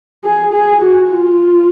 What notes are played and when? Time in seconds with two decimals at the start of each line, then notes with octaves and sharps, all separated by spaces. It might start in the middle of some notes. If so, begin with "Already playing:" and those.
0.24 G#4
0.53 G#4
0.81 F#4
1.09 F4